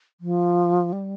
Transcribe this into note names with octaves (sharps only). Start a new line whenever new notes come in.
F3
G3